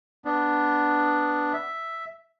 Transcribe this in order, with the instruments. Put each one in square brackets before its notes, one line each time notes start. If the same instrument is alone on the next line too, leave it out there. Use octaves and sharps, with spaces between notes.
[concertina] B3 D4
E5